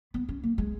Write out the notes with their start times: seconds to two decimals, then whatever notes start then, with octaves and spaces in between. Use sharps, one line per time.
0.14 B3
0.29 C#4
0.43 A#3
0.58 G#3